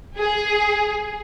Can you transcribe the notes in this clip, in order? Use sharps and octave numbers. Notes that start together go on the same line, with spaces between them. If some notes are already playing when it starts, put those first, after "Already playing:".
G#4